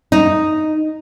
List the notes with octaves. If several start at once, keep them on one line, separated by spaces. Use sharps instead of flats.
D#4